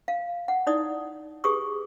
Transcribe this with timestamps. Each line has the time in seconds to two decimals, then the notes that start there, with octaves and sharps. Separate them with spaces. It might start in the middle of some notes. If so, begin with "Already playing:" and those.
0.08 F5
0.48 F#5
0.67 D#4 E4 D5 D#6
1.44 G4 G#4 B4 C#6 D#6